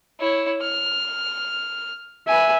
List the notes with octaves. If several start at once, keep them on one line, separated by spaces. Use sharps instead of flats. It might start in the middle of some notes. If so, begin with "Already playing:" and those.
E4 C#5
F6
B4 E5 G#5